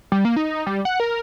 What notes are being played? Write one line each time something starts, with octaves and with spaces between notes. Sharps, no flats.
G3
A#3
D#4
G3
F#5
A#4